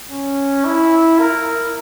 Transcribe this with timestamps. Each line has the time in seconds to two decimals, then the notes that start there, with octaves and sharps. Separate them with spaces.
0.10 C#4
0.65 E4
1.19 A#4